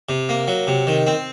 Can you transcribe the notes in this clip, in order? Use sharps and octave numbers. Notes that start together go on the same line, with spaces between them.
C3
A#3
F#3
C3
D#3
C4